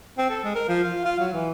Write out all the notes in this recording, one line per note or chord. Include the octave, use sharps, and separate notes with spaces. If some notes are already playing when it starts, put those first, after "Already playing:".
C4
A4
G#3
A#4
F3
F4
F4
F#3
E3